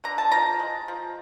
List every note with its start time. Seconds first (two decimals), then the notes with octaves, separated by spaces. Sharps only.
0.04 D3 A#5
0.18 A5
0.32 F3 A#5
0.59 G#3
0.88 F3